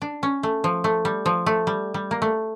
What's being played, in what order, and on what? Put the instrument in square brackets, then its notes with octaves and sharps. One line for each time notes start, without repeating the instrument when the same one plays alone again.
[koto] D4
C#4
A3
F3
A3
G3
F3
A3
G3
G3
A#3
A3